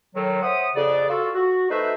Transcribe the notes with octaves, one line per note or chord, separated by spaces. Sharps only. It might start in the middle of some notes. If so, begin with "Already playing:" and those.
A2 D#3 F#3
C5 C#5 E5 F#5 D#6
F2 C#3 D5
F4 F#4 A4
F#4
A3 D#4 F#4 B4 C5 E5